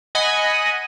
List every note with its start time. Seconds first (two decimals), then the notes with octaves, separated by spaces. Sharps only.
0.15 D#5 F#5 G#5 B5